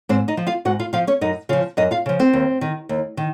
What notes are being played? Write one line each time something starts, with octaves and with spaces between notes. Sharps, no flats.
G#2 C4 C5
D#4 D#5
F3
F4 F5
G#2 F#4 F#5
F4 F5
F3 F4 F5
C#4 C#5
F#2 D#4 D#5
C#3 F3 F4 F5
F#2 D#4 D#5
F4 F5
C#3 F3
C4 C5
D#2
D#3
D#2
D#3